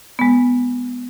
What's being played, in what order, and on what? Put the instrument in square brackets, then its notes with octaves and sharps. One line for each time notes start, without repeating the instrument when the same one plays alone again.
[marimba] G#3 B3